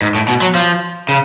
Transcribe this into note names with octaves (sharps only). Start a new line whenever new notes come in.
G#2
A2
B2
F#3
F3
C#3